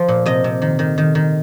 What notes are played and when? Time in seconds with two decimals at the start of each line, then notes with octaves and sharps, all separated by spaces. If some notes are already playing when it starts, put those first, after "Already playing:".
Already playing: F3
0.08 A#2
0.26 C3 D#5
0.44 C3
0.62 D#3
0.79 D#3
0.98 D#3
1.15 D#3